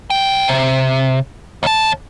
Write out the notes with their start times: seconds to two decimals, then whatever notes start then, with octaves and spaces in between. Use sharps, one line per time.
0.10 B1 G5
0.48 C3
1.63 D#2 A5